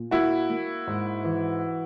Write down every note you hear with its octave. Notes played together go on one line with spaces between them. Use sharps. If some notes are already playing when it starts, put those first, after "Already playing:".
Already playing: A#2
A#3 E4 F#4
A#3
G#2
E3